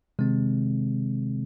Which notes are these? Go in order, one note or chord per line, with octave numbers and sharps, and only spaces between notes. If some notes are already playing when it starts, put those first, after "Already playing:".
C3 D#3 G#3 C4